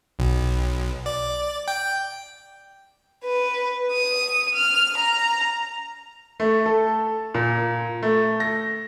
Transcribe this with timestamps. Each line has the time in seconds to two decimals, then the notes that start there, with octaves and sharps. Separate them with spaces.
0.19 B1
1.06 D5
1.68 G5
3.24 B4
3.92 D#6
4.55 F6
4.96 A#5
6.40 A3
6.66 A4
7.34 A#2
8.03 A3
8.40 A#6